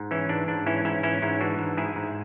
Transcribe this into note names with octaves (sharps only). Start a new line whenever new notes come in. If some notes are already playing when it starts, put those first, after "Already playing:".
Already playing: G#2
E3 C#4 E4
G#2 D4
G#2 D4
E3 C#4 E4
G#2 C#4 E4
E3 C#4 E4
G#2 C#4 E4
E3 D4 F#4
G#2
G#2 E4 G#4
G#2